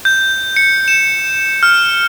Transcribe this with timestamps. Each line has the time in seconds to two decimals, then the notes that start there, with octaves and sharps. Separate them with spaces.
0.05 G6
0.56 C#7
0.88 E7
1.63 F6